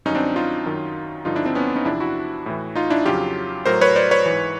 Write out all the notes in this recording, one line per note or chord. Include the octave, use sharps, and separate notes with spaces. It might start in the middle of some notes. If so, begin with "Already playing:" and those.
G2 D#3 F#3 C#4 D#4
C4 D4
D#4 F4
F#2 D#3 F#3
G2 D3 F3 D#4 F4
D4 E4
C4 D4
B3 C#4
C#4 D#4
E2 C3 F3 D4 E4
E4 F#4
A2 E3
D#4 F4
D4 E4
F2 C#3 F#3 F4 G4
A2 F#3 A#4 C5
B4 C#5
C5 D5
B4 C#5
G#2 E3